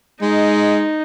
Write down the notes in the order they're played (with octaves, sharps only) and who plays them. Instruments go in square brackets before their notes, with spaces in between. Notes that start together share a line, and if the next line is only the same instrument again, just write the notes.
[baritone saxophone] G#3 [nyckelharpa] D#4